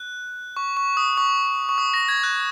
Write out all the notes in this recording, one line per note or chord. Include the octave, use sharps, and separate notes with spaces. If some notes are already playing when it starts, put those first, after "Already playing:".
Already playing: F#6
C#6
C#6
D#6
C#6
C#6
D#6
A#6
G#6
F#6